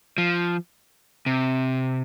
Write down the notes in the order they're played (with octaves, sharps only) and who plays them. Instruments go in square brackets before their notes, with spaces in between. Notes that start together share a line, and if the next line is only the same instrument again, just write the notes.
[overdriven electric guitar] F3
C3